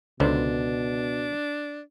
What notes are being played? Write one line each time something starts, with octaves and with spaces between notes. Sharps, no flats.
C#2 B2 D3 D4 C5